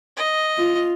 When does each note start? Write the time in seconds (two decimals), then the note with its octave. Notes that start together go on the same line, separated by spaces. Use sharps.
0.17 D#5
0.58 F4